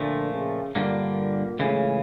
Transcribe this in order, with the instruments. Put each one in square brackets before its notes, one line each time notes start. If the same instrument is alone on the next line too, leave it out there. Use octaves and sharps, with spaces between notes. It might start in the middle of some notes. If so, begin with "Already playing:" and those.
Already playing: [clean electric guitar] A#2 F3 A3 [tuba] D3
[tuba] C#3
[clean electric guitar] G2 D3 G3 A#3 [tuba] A#2
[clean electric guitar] C#2 C#3 E3 [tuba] A2